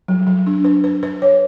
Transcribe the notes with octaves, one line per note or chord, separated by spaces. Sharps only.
F#3
F#3
D4
B4
B4
B4
C#5